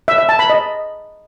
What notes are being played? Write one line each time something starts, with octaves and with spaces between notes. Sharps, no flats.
E5
E5
A5
B5
D#5